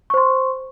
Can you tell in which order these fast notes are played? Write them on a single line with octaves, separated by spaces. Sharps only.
C#6 C5 C6